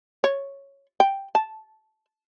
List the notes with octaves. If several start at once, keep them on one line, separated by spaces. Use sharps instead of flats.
C#5
G5
A5